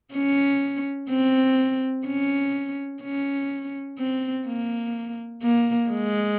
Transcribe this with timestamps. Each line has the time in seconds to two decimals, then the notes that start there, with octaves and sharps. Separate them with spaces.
0.14 C#4
1.09 C4
2.06 C#4
3.02 C#4
3.98 C4
4.46 A#3
5.42 A#3
5.90 G#3